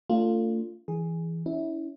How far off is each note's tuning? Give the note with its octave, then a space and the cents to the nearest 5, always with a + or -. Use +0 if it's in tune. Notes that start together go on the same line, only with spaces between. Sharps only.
A3 +35 D4 -25 F4 +0
E3 +0 G#4 +0
C#4 +25 E4 -20